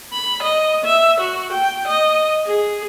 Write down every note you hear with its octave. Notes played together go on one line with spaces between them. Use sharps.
B5
D#5
E5
F#4
G5
D#5
G#4